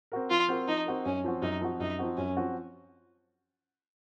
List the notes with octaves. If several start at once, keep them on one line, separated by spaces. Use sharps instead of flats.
C4 F#4 A#4
F3 F4
C4 F#4 A#4
F3 D#4
C4 F#4 A#4
F#2 C#4
F3 C4 F#4
F#2 D#4
F3 C4 F#4
F#2 D#4
F3 C4 F#4
F#2 C#4
F3 C4 F#4